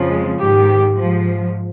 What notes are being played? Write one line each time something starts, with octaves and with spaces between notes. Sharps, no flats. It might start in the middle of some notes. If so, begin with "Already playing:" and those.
Already playing: F2 C#3 F3
G#3
G#2 D#3 G4
G#2 F3